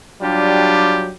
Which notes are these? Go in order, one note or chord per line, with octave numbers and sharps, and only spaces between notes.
F#3 G3 D4 F4 G4